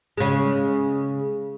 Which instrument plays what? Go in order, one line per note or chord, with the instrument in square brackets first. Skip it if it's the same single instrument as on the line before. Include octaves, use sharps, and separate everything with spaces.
[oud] C#3 G#3